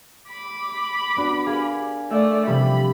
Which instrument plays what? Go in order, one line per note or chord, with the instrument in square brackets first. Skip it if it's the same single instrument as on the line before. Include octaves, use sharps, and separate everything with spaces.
[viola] B5 D6
[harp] B3 D4 F#4
G#4 A#4 F5
[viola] A3 D5 [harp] E5
[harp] C3 F3 G3 [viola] B5